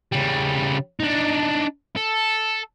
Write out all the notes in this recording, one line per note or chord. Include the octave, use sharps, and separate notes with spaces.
C#3 G3
D4 D#4
A4